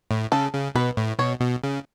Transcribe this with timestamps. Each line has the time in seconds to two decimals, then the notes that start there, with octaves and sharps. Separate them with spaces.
0.11 A2
0.32 C#3 A4
0.53 C#3
0.75 B2 B4
0.97 A2
1.19 B2 C#5
1.41 B2
1.64 C#3